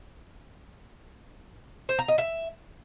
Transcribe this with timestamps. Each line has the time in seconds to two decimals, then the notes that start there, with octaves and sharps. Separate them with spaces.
1.89 C5
1.99 A#5
2.08 D#5
2.18 E5